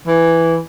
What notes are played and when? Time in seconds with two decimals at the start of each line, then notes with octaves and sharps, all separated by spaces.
0.07 E3